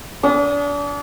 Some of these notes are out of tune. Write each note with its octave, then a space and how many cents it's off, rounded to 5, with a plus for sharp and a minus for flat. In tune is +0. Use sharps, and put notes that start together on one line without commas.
D4 -35 D#6 +0